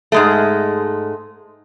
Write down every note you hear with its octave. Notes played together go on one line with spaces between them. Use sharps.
G#2 G#3 A3